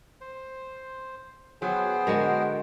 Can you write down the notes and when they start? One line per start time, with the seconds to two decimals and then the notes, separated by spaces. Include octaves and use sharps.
0.21 C5
1.62 F#3 B3 G#4 C5 G5
2.07 D3 G#3 F#4 A#4